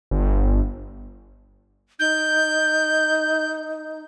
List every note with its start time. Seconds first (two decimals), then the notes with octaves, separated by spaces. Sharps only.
0.11 G1
2.00 D#4 G6